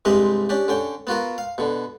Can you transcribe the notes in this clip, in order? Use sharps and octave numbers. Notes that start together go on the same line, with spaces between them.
C2 G2 G#3 C4 G4 D#5
C#4 D4 G4
D3 C#4 G5
B3 F4 F#4 A#4
F5
B2 D3